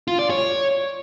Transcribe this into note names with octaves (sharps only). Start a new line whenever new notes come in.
F4
D5
C#5